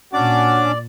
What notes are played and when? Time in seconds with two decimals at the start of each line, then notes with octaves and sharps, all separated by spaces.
0.13 A#2 C#4 D4 F#4 D5 D6